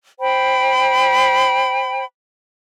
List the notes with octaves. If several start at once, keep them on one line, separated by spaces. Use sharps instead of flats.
C5 G5 B5